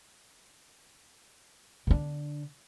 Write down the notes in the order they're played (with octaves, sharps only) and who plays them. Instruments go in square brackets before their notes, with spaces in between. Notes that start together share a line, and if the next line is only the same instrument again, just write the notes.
[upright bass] D3 D4